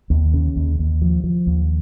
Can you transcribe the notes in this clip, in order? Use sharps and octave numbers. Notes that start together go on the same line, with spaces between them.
D#2
C#3
D#2
D#2
F3
F3
D#2